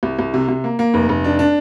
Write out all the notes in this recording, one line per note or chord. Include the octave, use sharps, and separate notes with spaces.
C2
C2
C3
C3
A#3
A#3
F1
F1
D4
D4